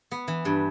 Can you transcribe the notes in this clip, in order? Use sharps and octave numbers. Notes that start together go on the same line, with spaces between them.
B3
E3
G2